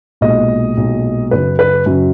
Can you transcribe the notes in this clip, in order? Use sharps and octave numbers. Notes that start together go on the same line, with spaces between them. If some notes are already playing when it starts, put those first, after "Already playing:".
B1 A#2 G#3 D#5
B1 A#2 G#3
F#2 C#3 F#3 B4
B4
F#2 C#3 F#3